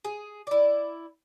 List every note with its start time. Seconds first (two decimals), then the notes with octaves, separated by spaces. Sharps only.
0.05 G#4
0.47 E4 D5